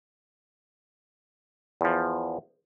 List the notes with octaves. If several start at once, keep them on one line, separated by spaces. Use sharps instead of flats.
E2 F3